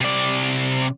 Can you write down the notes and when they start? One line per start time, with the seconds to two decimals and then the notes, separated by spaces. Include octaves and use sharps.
0.01 C3 D5